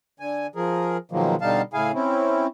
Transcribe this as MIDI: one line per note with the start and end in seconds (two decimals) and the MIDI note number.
0.20 0.47 50
0.20 0.47 80
0.56 0.97 53
0.56 0.97 68
0.56 0.97 70
1.11 1.35 47
1.11 1.35 51
1.11 1.35 53
1.11 1.35 54
1.11 1.35 56
1.11 1.35 58
1.41 1.62 47
1.41 1.62 50
1.41 1.62 55
1.41 1.62 63
1.41 1.62 77
1.41 1.62 81
1.73 1.92 45
1.73 1.92 49
1.73 1.92 64
1.73 1.92 68
1.73 1.92 77
1.73 1.92 80
1.94 2.47 60
1.94 2.47 61
1.94 2.47 64